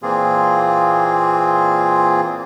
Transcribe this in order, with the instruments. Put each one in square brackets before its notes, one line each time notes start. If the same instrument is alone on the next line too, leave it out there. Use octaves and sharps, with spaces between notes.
[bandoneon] A#2 E3 A#3 C4 F4 G#4